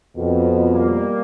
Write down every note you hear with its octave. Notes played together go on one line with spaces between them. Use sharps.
F2 B2
G3 A#3